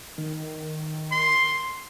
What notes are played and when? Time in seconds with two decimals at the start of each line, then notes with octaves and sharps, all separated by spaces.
0.18 D#3
1.12 C6